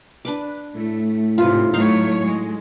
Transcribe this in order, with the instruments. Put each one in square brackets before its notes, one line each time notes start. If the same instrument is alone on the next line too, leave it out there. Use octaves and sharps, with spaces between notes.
[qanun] D4 B4 D6
[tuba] A2 [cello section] A3
[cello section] G#2 C3 [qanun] F4 B4
[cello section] F#3 A3 C#5 [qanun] D#4 F5
[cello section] G#3